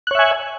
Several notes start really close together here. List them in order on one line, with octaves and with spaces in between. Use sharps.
F#6 C#5 E5 G#5